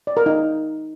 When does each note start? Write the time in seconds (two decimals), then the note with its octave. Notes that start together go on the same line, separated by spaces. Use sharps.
0.07 D5
0.17 A#4
0.26 D#4